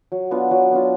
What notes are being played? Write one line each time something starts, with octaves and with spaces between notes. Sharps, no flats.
F#3
B3 D4 F4
F#3
B3 D4 F4